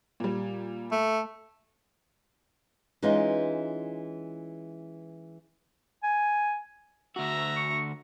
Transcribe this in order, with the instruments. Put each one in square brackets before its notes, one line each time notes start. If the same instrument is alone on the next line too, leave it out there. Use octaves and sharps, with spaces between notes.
[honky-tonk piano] A#2 G3
[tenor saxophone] A3
[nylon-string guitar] E3 G#3 C#4 D#4 F4
[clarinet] G#5
[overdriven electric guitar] D2 F#4 [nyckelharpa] E5 A#5
[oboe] C#6